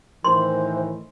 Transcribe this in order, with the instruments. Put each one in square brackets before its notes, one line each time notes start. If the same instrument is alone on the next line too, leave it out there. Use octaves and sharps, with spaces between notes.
[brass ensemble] A2 D#3 E3 [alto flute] C5 [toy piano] C6